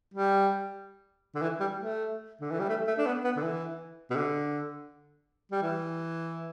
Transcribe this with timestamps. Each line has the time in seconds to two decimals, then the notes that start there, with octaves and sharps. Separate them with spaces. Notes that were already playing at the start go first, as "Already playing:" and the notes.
0.14 G3
1.35 D3
1.42 E3
1.60 G3
1.78 A3
2.41 D3
2.51 E3
2.59 G3
2.69 A3
2.87 A3
2.98 D4
3.06 B3
3.24 B3
3.36 D3
3.43 E3
4.10 B2
4.16 D3
5.52 G3
5.62 E3